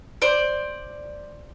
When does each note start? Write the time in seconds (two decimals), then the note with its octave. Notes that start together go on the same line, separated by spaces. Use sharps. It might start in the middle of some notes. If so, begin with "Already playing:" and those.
0.22 C5 D5